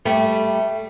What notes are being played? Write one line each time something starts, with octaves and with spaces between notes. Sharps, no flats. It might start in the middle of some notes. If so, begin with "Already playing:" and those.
G3 A3